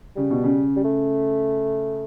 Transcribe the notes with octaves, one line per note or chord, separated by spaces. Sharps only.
C#3 G3
B2
C#3
G3
A3